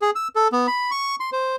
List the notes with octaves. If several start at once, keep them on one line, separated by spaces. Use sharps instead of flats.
G#4
E6
A4
B3
B5
C#6
C6
C5